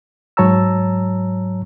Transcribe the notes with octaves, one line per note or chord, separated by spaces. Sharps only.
G#2 F#3 C#5 A5 A#5 E6